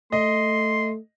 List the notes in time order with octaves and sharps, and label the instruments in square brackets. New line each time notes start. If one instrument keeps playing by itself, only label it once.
[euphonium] A3 [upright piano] D#5 [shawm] C6